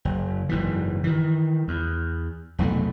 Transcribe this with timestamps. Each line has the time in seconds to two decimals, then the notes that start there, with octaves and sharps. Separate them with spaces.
0.05 F#1
0.49 F#1 G#2 E3
1.04 D#3 E3
1.68 E2
2.59 F1 B1 A#2 A3